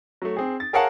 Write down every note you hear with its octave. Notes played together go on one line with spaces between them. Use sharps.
F#3 A3
C4 G#4
A6
G#4 A#4 C#5 F5 F#5 A5